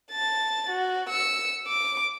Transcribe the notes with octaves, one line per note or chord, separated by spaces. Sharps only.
A5 A6
F#4
E6 C#7
D6